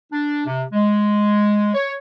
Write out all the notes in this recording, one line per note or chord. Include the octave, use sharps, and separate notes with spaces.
D4
C3
G#3
C#5